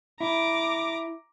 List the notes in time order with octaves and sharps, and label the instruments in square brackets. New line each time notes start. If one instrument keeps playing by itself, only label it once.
[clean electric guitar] E4 [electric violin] A#5 D6